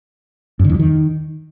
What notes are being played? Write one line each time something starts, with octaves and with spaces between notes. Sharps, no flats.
F#2
D3
E2
F#3
D#3